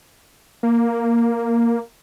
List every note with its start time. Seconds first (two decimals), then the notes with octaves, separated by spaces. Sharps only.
0.63 A#3